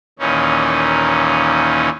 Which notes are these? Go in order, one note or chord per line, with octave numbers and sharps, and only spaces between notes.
D#2 A#2 E3 C#4 D#4